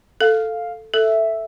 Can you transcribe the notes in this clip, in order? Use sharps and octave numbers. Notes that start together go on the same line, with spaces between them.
A4 F5
A4 E5